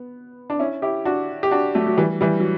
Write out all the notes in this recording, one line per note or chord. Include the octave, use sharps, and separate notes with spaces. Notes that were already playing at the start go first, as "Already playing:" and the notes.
Already playing: B3
D4
C#4 E4
E4 G4
D4 F#4
G4
D4 F#4
F#3 A3
F#3
E3 G3
E3 G3
F#3